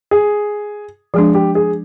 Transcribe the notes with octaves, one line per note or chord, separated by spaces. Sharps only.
G#4
F3 G#3 D4 G#4
G4
G#4